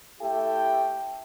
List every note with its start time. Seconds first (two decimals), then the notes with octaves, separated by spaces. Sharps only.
0.20 A3 E4 G4 A4 E5 G5